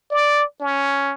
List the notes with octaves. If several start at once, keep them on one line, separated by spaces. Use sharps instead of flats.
D5
C#4